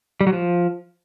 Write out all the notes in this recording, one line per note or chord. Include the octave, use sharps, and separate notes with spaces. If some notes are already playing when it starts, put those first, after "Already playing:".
G3
F#3
F3